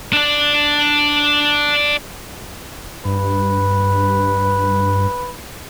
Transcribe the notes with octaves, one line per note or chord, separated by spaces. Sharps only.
D4 D5
G2 B4